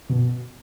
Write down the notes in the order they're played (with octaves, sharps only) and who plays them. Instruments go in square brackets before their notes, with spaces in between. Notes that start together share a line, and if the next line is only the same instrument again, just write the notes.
[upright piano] B2